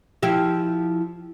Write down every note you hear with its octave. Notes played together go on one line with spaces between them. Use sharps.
F3 E4 G4